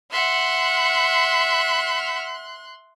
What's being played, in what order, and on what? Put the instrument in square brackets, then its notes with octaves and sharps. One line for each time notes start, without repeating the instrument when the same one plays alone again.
[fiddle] E5 F#5 [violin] C6 F#6